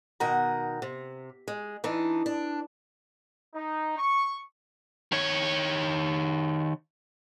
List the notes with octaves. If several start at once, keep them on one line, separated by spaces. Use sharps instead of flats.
B2 D#3 F#5 A#5
C3
G#3
E3 D4 D#4
D4
D#4
C#6
D#3 C#5